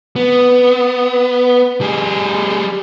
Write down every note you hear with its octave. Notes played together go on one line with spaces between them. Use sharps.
B3
G3 G#4